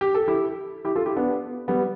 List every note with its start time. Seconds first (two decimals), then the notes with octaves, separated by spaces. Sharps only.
0.01 G4
0.15 A4
0.28 E4 G4
0.85 E4 G4
0.96 F4 A4
1.06 E4 G4
1.16 B3 D4
1.68 G3 B3